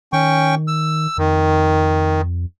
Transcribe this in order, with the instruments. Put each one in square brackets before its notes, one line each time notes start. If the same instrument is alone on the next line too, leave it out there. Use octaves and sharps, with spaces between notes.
[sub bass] D#3 [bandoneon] C#4 G5 C#6
[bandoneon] E6
[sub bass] F2 [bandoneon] D#3